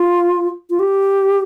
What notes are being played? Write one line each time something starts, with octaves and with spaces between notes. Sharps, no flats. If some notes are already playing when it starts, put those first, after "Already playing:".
Already playing: F4
F4
G4